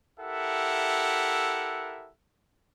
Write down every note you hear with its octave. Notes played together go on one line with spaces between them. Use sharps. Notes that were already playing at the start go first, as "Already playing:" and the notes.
E4 G4 A4 A#4 E5 F#5